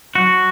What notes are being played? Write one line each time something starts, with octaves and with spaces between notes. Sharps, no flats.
F#3 F#4